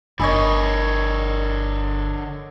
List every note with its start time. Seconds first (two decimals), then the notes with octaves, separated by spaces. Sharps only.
0.20 G1 D3 A#4 C#5 D#5 E5 G#5 B5